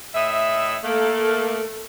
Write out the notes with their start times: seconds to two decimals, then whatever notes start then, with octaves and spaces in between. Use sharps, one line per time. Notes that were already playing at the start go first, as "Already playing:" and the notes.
0.15 A2 D#5 E5
0.84 A3 A#3 A4